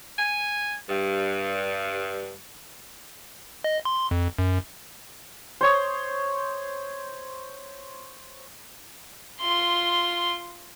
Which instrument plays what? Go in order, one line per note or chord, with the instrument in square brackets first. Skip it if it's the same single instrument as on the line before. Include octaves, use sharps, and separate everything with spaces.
[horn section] G#5
G2
[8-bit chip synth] D#5
C6
F2
F#2
[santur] C5 C#5 D#6
[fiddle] F4 C6